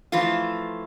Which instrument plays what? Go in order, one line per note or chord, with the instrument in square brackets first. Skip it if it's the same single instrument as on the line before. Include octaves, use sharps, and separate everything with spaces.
[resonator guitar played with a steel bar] E3 F3 A3 F4